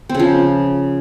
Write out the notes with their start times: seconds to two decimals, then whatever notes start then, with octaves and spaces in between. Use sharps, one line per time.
0.09 C4
0.14 C#3
0.20 F3